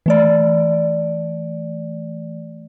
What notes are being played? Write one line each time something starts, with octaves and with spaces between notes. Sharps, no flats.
E3 A3 D5